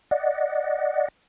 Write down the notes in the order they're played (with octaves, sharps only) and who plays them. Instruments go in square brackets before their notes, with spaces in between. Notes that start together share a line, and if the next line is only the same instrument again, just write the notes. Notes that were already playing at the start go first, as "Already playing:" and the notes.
[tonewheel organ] D5 D#5 F#5